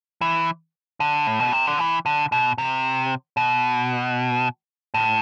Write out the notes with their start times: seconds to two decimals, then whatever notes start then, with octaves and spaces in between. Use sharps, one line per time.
0.21 E3
1.00 D3
1.27 A2
1.40 B2
1.53 C3
1.66 D3
1.79 E3
2.06 D3
2.32 B2
2.58 C3
3.37 B2
4.94 A2